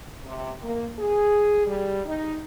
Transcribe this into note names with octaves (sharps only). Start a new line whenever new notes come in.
C3
A#3
G#4
G3
D#4